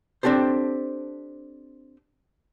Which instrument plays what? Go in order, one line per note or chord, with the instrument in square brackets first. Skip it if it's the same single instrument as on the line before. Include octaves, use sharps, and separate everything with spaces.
[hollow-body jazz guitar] C4 D4 G4 A4 C5